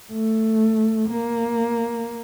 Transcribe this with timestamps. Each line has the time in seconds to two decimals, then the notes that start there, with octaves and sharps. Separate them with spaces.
0.12 A3
1.09 A#3